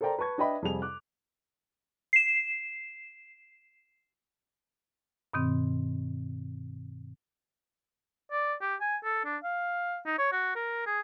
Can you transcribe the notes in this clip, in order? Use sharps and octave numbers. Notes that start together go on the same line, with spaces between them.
A4 A#4 C5 D5 G5 A#5
B4 A5 C#6 G#6
D4 B4 D#5 E5 G5 B5
F2 C3 G3 G#4 F7
D6 F#6
C7 E7
G2 B2 D#3 C4
D5
G4
G#5
A4
D4
F5
D#4
C#5
F#4
A#4
G#4